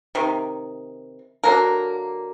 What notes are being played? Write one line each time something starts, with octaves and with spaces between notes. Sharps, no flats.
C3 D#3
D3 F#3 A#3 A#4